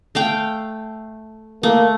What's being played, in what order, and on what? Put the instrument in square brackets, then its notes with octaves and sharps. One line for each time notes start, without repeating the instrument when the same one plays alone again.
[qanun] A3 F5 G5
[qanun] A3 [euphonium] A#3